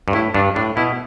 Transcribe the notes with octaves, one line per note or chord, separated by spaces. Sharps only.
G2
A2 E4
G2 D4
A2 D4
B2 E4